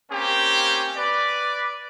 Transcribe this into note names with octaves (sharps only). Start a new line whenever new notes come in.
A#3 C4 C#4 G4
B4 D5